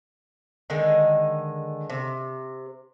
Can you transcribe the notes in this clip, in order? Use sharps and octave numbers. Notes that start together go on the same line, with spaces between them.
D3 D#3 G#3 D#4
C3